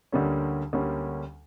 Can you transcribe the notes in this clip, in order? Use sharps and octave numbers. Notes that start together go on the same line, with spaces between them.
D2 D3 G3 A#3 C#4
D2 D3 G3 A#3 C#4